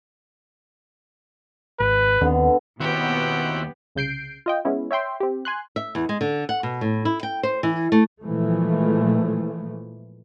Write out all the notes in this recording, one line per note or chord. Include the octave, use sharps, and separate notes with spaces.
G#1 B4
D#2 D3 D#3 B3 C4
D#2 B2 B3 C4 E4 F#4 G4 F#5
C2 C#3 G6 C7 D7
F4 D#5 G5
G#3 B3 C#4 E4
C#5 E5 G5 C6
C4 G4
G#5 C6 F#6
E5
E2
G#3
D3
F#5
B2
A2
E4
G5
C5
E3
A3
A#2 E3 F3 G#3 A3